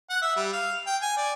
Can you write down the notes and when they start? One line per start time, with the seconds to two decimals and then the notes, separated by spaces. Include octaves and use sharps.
0.10 F#5
0.22 E5
0.36 G3
0.53 F5
0.87 G5
1.02 G#5
1.17 D5